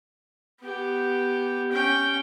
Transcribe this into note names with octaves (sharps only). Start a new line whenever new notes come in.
B3 G4
C#4 G5